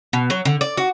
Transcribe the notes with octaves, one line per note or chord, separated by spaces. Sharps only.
B2
F#3
D3
D5
F#4